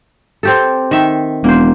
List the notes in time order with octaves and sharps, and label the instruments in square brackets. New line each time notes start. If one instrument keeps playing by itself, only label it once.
[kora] C4 G4 A4
D#3 E5
[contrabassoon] E1 [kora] A#3 C5